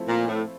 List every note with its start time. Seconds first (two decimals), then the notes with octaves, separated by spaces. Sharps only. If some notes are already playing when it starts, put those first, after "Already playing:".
Already playing: F3 A3 C4 E4
0.09 A#2
0.28 A2